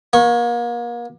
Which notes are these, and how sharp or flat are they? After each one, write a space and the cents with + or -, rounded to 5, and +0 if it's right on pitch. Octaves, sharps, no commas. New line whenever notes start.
A#3 +35 C#6 -15